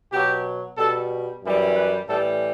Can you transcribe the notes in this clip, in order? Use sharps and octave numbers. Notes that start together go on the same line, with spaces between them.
B2 F#3 G4
B2 G3 A4
F#2 E3 G3
B4
A2 E3 G3 A4